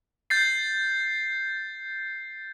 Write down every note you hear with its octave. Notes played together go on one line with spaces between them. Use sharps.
G6 A6 C7